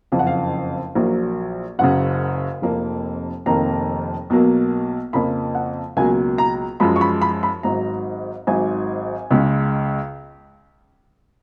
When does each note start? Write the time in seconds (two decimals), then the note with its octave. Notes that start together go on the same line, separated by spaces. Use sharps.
0.12 F#1 F2 C#3 F3 F5
0.19 F#5
0.27 F5
0.95 A#1 A#2 F#3 A#3
1.79 F#1 F#2 C#3 F#5
2.62 F1 F2 F3 A#3
3.46 F1 F2 D#3 A#3 A#5
4.30 B1 B2 F#3 A#3
5.13 F2 C#3 F3 A#3 B5
5.55 F#5
5.97 C#2 B2 F#3 A#3 G#5
6.38 A#5
6.80 F#2 F3 G#3 B5
6.96 C#6
7.01 B5
7.22 B5
7.43 B5
7.63 G#1 G#2 F#3 A#5
8.47 G#1 G#2 F#3 G#5
9.31 C#2 C#3 G#3